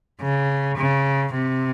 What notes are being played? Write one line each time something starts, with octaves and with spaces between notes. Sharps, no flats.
C#3
C#3
C3